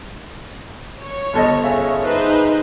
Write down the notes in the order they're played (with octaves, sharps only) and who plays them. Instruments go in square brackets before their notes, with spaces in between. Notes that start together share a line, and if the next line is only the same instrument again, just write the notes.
[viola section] C#5
[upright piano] G1 A4 D#5
[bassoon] C#3 [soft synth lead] E5
[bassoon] G#2 [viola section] D#4 B4 C5